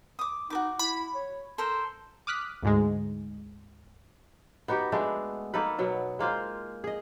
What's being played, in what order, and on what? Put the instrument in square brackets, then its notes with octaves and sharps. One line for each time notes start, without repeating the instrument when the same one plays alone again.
[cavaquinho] D6 D#6
[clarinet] D#4 [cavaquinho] F#4 A#4 D6
[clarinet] E4 [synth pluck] B5
[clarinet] C#5
[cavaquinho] A4 A#4 C5 [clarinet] C6
[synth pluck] D6 D#6 F6 F#6 B6
D2 G#2 G#3
[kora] B3 D#4 F#4 G4
G#3 A3 B3 D4
A#3 D#4 A4 B4
B2 F#3 B3
G#3 A#3 F4 C5
G#4 D#5